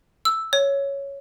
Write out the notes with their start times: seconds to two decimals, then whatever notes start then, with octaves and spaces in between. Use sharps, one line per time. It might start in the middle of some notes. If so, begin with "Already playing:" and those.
0.25 E6
0.53 C#5